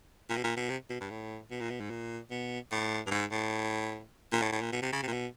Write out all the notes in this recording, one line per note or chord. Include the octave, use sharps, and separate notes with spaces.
A#2
B2
A#2
B2
C3
B2
G2
A2
B2
A#2
B2
G#2
A#2
B2
A2
G2
G#2
A2
A#2
A2
A2
A#2
B2
C3
C#3
C3
A#2
B2